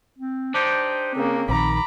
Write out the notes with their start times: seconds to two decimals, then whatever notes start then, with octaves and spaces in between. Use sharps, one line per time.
0.18 C4
0.54 D4 D#4 G4 C5
1.14 C#3 A#3 C4
1.49 A#1 D#3 A#5 B5 D6